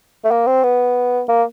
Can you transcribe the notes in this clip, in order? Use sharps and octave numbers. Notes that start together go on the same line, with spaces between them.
A3
A#3
C4
B3
A#3